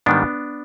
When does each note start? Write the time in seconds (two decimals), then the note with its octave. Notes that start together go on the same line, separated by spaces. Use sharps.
0.06 G#2 D#3 G3 B3 D4